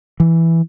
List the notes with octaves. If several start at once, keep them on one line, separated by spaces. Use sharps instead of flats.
E3